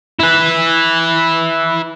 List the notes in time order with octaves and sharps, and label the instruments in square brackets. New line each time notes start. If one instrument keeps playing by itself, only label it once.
[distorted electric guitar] E4 B4